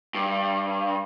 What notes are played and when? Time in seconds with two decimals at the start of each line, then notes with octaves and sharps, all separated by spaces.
0.15 G2